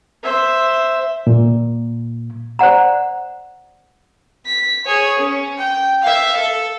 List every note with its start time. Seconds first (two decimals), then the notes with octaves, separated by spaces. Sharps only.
0.23 C5 E5
1.27 A#2
2.59 C5 D5 F#5 A#5
4.46 B6
4.85 G#4 C#5
5.19 C#4
5.58 G5
6.02 E5 F5
6.37 A4